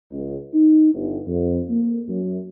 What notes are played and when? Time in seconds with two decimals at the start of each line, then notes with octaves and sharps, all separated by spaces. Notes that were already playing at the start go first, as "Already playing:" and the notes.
0.11 C#2
0.53 D#4
0.94 G1
1.27 F2
1.69 A#3
2.08 F#2